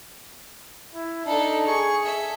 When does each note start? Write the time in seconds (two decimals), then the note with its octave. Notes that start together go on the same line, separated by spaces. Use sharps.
0.94 E4
1.26 D4 D#4 A4
1.68 G#4 C#6
2.05 A4 E5